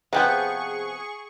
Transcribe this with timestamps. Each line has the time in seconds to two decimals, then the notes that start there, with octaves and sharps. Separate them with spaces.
0.13 C3 F3 B3 G#4 F#5 G5 C#6